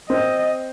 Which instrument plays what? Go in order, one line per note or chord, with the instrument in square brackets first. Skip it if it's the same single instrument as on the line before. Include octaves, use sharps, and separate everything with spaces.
[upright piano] C4 [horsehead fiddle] D#5